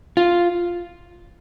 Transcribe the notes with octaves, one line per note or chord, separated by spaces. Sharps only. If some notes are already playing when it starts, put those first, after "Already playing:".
F4